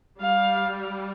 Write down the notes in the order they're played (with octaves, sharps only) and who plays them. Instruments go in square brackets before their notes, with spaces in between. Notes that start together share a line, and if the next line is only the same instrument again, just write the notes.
[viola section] G3 [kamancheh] F5